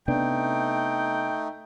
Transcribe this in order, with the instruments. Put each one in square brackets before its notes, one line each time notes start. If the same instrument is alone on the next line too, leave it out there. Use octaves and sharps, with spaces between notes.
[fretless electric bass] C3 B3 D4 [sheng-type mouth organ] A3 D#4 [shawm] G5